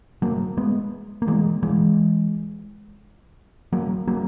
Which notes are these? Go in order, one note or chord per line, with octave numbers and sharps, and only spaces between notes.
F#3 A#3
G#3 B3
A#3
E3 G#3
E3 G#3
F#3 A#3
F#3 A#3